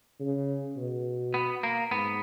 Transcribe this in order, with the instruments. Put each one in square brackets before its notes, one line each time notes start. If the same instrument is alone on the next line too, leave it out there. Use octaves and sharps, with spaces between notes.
[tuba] C#3
B2
[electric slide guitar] B3
A#3
[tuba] G#2 [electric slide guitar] B3